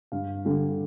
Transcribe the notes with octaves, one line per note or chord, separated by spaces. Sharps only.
G2 F5
D3 G3